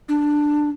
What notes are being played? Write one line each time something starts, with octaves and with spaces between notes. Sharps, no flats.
D4